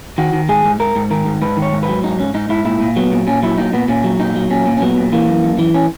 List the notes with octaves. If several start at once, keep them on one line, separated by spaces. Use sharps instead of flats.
D#3 F#4
D#3
G#2 G#4
G#2
G#2 A#4
G#2
D#3 A#4
G#2
G#2 B4
D#3
C#5
G#2
B4
F#3
G#2 D#4
G#2 C#4
G#2 D#4
G#2 E4
A#2 E4
A#2
F#3 B3
A#2
A#2 C#4
F#3 E4
A#2 D#4
A#2 B3
A#2 C#4
F#3
A#2 D#4
F#3
A#2 C#4
A#2
C#4
F#3 B3
A#2
E3 A#3
F#2
F#2
E3
C#4